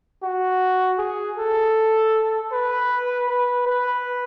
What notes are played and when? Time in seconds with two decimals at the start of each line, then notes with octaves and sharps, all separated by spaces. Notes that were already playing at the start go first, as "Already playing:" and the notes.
0.23 F#4
0.98 G#4
1.38 A4
2.52 B4
3.28 B4
3.66 B4